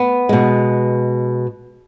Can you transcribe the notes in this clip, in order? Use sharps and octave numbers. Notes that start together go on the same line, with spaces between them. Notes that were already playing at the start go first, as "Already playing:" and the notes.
Already playing: B3
B2 G#3